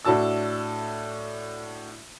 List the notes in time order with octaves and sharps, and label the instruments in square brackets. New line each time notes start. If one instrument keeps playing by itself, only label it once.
[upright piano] A2 D4 F#4 A5 E6